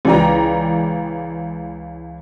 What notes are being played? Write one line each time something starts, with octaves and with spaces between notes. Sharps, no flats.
C#2 E3 D5 G5 A#5